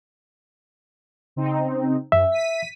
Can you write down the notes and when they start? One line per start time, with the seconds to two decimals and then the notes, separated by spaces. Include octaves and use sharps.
1.36 C#3 C4 D#4
2.12 F#2 E5
2.32 B6 D#7